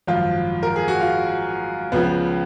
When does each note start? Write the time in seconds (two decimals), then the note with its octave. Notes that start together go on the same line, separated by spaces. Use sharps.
0.07 G#1 F#2 F3 F4
0.63 A#4
0.76 G#4
0.88 F#4
1.01 F4
1.92 C#2 C#3 F3 B3